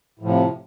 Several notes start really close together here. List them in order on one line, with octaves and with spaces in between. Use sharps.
A2 F3 C3